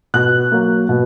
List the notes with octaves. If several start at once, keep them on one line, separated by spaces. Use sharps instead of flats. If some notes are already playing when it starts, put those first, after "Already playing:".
B2 F#6
F#3 A#3
B2